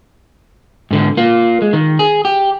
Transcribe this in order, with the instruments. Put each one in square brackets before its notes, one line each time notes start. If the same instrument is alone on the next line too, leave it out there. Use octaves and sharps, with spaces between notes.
[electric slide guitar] G#2 D3
A#3 F4
G#3
D#3
G#4
G4